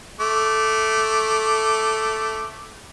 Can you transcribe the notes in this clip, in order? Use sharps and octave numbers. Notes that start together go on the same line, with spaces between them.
A3 D6